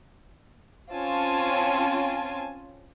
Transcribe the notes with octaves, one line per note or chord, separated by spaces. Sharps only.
C4 C#4 F4 G#5 A5